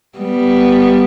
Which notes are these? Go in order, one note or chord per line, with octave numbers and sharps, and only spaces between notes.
G3 B3